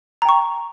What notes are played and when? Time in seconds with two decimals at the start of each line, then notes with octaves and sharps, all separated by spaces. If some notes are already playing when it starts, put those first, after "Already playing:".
0.22 A#5
0.25 G5
0.29 C#6